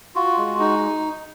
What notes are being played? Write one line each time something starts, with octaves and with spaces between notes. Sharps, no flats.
F4 F#4
G#3
D#4